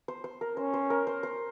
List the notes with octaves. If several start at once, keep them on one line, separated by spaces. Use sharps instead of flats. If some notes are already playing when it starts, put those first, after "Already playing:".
C5
C5
A#4
C#4 C5
C5
A#4
C5
C5